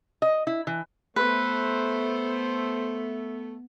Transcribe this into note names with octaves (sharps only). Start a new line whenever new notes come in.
D#5
E4
E3
A3 B3 B4 C5